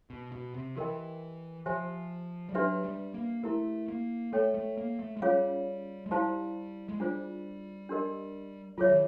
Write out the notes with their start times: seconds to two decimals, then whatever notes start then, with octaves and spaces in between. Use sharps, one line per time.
0.10 B2
0.32 B2
0.54 C3
0.76 E3 G4 A#4 D#5 G5
1.66 F3 G4 C5 E5 G#5
2.49 G3
2.54 F#3 D4 G4 B4 E5
2.84 G3
3.14 A#3
3.43 A3 E4 G4 A#4
3.88 A#3
4.33 A3 A4 C#5 E5 G5
4.55 A3
4.77 A#3
4.99 A3
5.17 G#3
5.22 G3 C#4 F4 G#4 C#5 F5
6.06 G#3
6.11 G3 E4 G4 C5 F5 A5
6.89 G#3
7.00 G3 D4 F4 G#4 C5
7.89 D4 G4 A#4 D#5
8.78 F#3 F4 G#4 C#5 E5
8.89 D#3